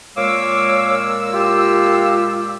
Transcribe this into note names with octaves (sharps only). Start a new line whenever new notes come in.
A#2 G#3 C#5 F5 D6 E6
F4 G4